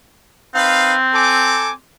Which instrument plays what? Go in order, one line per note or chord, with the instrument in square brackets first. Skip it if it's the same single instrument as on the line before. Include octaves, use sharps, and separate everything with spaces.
[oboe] C4 [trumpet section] D#4 B4 F5
[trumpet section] A4 G#5 D6